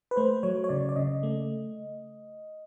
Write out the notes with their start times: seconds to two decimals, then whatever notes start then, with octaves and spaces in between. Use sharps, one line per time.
0.11 B4
0.16 A3 C5
0.43 F#3 C#5
0.64 C#5
0.69 C#3 D5
0.89 D5
0.96 C#3 D#5
1.23 A3